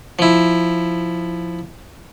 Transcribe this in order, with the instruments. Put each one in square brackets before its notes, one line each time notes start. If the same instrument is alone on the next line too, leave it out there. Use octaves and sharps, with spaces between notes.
[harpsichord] F3 E4